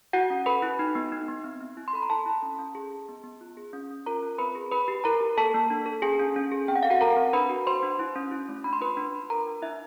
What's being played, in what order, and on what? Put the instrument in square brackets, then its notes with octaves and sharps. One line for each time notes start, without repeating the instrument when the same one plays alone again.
[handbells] E4 F#4 F#5
C#4
A4 B4 B5
E4
D#4
B3
D#4
B3
C4
C4
E4
C6
A4 B5
A#5
E4 A4 A5
E4
C#4
C#4
G#4
G#4
B3
B3
F4
G#4
C#4
C#4
F4 A#4 A#5
F4
C4 B4 B5
G#4
E4 B4 B5
G4
E4 A#4 A#5
G4
A#3 A4 A5
A#3
D4
A4
C#4 G#4 G#5
C#4
C#4
G#4
C4 G5
F#5
A4 F5
F#4 F#5
A4 A#4 A#5
C4
D4 B4 B5
F#4
F#4 C5 C6
D4
E4
C#4
E4
A3
D4 B5
C6
F4 B4 B5
D4
F4
D4 A#4 A#5
D4
D4 E4 E5